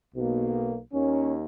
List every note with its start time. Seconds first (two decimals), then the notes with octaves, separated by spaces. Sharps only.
0.15 B1 B2 A#3
0.93 D#2 D#3 A#3 C#4